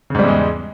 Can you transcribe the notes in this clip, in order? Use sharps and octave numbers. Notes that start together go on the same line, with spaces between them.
E2 G#2 C#3 G3 G#3